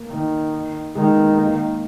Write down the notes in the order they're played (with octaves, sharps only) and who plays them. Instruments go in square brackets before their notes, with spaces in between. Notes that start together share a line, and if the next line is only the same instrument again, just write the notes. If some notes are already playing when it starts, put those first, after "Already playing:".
Already playing: [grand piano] A#3
[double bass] D#3
[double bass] D#3 [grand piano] G#3
[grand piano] A#3
B3
A#3
A#3